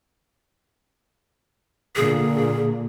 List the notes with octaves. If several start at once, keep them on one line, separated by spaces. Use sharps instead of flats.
A#2 D3 A#3 G#4